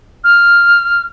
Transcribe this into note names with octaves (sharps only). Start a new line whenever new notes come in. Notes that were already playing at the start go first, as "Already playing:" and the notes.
F6